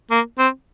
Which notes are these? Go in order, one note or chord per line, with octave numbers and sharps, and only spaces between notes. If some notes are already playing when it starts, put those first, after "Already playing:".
A#3
C4